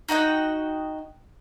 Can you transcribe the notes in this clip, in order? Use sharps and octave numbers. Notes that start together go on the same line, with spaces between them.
D#4 F#4 D#5 G5